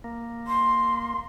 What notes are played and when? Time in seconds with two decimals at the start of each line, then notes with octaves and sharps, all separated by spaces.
0.04 A#3
0.47 C6